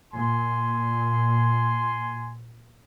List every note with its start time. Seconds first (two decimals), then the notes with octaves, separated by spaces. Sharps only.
0.14 A#2 G#5 C6